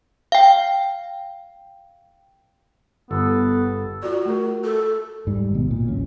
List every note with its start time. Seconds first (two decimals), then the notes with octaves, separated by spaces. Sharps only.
0.32 F5 G5
3.11 G1 B3 A4
4.03 F4 F#4 D5
4.26 A3 G#4 A#4
4.64 A4
5.27 G#2 G3
5.51 G#1 B2
5.71 A#2
5.88 D1 A1 C#4